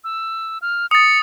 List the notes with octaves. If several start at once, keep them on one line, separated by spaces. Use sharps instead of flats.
E6
F6
D#6 A6 C#7